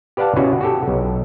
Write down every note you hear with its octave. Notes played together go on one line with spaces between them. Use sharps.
G4 B4 D5 F5 F#5 A5
B2 B3 C#4 E4 F#4
F#4 G4 A4
B1